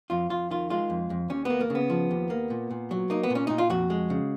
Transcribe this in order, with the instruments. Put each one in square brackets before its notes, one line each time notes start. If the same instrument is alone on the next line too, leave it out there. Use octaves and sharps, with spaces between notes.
[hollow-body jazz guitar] F2 F4
F2 F4
D#3 F4
G#3 F4
F2
F2
D#2 C#4
A#3 B3
A#3
C#3
B3
F3
D#2
A#3
A#2
A#2
F#3
A#3 D#4
B3
A#2
C#4
A#2 D#4
F4
F2 F#4
G#3
C#3